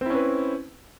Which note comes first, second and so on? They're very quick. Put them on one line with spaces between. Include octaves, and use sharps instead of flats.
C4 E4 C#4 B4